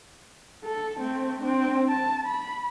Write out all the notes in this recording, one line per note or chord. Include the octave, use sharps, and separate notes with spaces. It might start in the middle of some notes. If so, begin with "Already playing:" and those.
A4
A3 C4
C4 D4
A5
B5